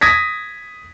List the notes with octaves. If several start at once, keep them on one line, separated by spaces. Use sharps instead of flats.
D#6 G#6 A#6 B6